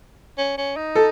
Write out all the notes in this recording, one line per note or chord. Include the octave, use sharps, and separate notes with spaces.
C#4
C#4
D#4
A4